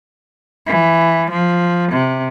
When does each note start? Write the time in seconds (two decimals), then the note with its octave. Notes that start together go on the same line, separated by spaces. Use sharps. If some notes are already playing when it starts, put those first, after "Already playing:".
0.66 E3
1.30 F3
1.92 C3